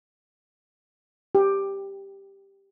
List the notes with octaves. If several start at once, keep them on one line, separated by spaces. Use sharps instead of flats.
G4